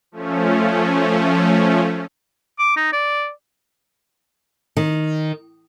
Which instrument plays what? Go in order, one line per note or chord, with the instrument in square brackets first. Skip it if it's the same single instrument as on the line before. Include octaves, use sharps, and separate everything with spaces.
[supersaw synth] F3 A3 C#4
[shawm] D6
D#4
D5
[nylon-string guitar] D#3